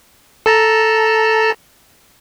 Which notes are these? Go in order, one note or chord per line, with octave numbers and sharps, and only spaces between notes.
A4 A5 A#5